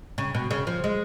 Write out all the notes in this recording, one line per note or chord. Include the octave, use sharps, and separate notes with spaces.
C#3
B2
C#3
F3
G#3